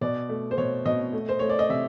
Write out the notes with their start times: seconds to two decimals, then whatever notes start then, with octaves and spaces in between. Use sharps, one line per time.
0.01 B2 D5
0.29 A3
0.51 C5
0.58 B2 C#5
0.85 B2 D#5
1.13 A3
1.29 C5
1.39 A3 C#5
1.49 D5
1.59 D#5
1.69 C3 E5